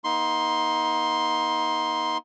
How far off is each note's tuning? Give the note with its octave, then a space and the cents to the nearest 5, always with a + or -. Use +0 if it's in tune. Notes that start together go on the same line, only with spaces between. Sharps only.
A#3 +45 D#4 +25 C6 +5